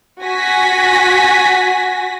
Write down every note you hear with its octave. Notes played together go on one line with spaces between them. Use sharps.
F#4 G#5 A#6 B6